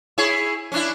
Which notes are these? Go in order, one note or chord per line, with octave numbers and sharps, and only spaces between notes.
E4 G#4 C#5
C#4 D4 E4